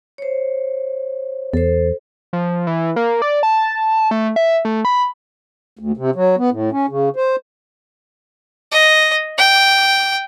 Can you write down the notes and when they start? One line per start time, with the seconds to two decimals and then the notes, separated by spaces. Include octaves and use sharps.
0.18 C5 C#5
1.54 E2 A4 C5
2.33 F3
2.67 E3
2.96 A#3
3.22 D5
3.43 A5
4.11 A3
4.36 E5
4.65 A3
4.85 B5
5.79 D2
5.97 C3
6.15 F#3
6.38 B3
6.51 A2
6.72 C#4
6.89 C#3
7.16 C5
8.72 D#5
9.38 G5